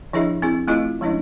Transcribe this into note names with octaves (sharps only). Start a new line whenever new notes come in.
F3 D4 E4 G#4 D#5 E5
C4 E4 G#4
A3 C4 E4 F4 G#4 D#5
F3 G#3 C#4 D4 E4 D#5